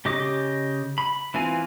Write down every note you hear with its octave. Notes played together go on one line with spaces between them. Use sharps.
C#3 G4 D#5 D6
B5
E3 C4 F4 G#5